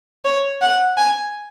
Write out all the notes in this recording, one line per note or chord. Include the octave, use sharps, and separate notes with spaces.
C#5
F#5
G#5